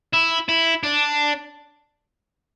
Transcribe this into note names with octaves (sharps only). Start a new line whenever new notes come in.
E4
E4
D4